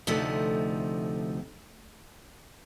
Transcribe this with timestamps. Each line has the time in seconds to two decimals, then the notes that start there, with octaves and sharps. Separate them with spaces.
0.07 D2 C3 F3 A3 D#4